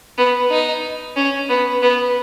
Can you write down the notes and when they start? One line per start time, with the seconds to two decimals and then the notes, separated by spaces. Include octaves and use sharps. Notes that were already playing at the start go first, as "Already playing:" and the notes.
0.18 B3
0.50 D#4
1.16 C#4
1.49 B3
1.82 B3